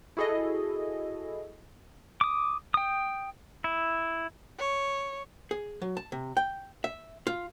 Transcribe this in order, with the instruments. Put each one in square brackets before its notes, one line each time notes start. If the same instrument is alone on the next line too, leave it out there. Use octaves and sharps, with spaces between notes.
[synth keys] E4 F#4 G#4 A4 D#5
[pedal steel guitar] D6 D#6
G5 D#6
E4
[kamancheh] C#5
[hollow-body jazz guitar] G#4
F#3
A5
C3
G5
E5
F4